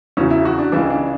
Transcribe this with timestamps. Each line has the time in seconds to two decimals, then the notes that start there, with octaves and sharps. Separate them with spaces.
0.17 E2 C#3 F#3 C#4
0.30 E4
0.45 F#4
0.59 D4
0.72 C#2 C#3 E3 D4
0.90 D4